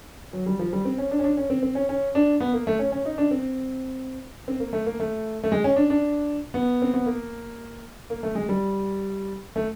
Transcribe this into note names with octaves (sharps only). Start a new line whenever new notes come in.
F#3
G3
F3
G3
C4
C#4
D4
C#4
D4
C#4
C4
C4
C#4
C#4
D4
B3
A#3
A3
C#4
C#4
D#4
D4
C4
C4
A#3
A3
A#3
A3
A3
G#3
C#4
D4
D4
B3
C4
B3
A#3
A#3
A3
G#3
G3
A3